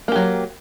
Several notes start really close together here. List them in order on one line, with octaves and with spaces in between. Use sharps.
A#3 G4 F#3